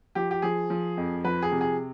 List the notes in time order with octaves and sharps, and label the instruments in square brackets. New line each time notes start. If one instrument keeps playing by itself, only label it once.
[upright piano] F3 G4
G4
F3 G#4
F3
F2
F3 B4
G#4
C3
G#4